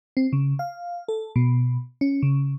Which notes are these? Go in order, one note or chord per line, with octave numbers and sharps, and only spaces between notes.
C4
C#3
F5
A4
B2
C#4
C#3